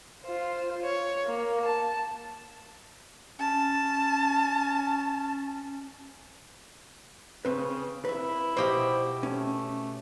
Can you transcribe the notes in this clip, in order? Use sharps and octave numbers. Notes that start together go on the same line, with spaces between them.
F4 C5
C#5
A#3
A5
C#4 A5
C#3 C4 B4
E4 B4 E5
B2 G4 C5 D#5 F5
A3 C#4